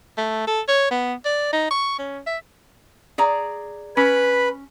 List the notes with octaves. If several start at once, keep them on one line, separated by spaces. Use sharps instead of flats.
A3
A4
C#5
B3
D5
D#4
C#6
C#4
E5
G#4 D5 A#5
C#4 B4 B5